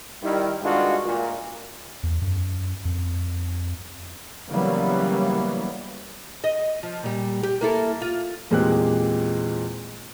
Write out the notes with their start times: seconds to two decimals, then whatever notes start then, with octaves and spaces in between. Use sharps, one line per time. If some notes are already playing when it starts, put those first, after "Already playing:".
0.22 D#3 G3 E4
0.62 G2 D#3 G#3 D4 F4 F#4
1.04 A#2
2.03 E2
2.21 F#2
2.85 F2
4.50 C#3 E3 F#3 G3 A#3 B3
6.44 D#5
6.83 F3
7.03 A#2 G3
7.43 G4
7.61 A#3 E4 A4
8.02 F4
8.51 E2 A#2 G#3 C4 G4 F#6